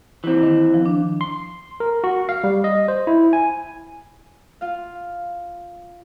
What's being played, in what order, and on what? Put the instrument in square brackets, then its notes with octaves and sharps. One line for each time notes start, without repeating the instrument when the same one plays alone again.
[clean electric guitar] E3 C4
[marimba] D#3
F3
D4
[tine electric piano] C6
A#4
F#4
F5
G3
D#5
C5
E4
G#5
[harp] F4 F5